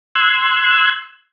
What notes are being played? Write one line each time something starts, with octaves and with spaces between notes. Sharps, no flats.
C6 E6 F#6 G#6